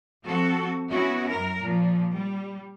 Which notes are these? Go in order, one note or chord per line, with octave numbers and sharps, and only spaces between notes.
F3 C4 F#4 A4
B3 C#4 E4 F#4
F#2 A#4
A#2 F3
G3